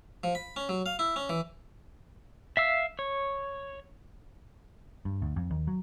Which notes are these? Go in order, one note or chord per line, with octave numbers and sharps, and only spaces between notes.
F3
B5
C#4
F#3
F5
E4
C#4
E3
E5 F5 E6
C#5
G2
D2
F2
D#2
F#3